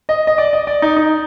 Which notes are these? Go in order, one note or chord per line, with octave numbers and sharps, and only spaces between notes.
D#5
D#5
D5
D#5
D5
D#4
D#4